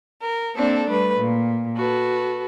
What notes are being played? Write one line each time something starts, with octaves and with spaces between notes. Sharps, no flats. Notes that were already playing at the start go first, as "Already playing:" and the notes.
A#4
A#3 C4 D4 A4
G3 A3 B4
A#2
F#4 A4 B4